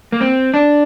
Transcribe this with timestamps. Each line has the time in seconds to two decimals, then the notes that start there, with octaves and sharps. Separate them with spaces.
0.12 A#3
0.21 C4
0.54 D4